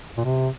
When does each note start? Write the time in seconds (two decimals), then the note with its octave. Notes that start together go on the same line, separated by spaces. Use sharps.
0.17 A#2
0.24 C3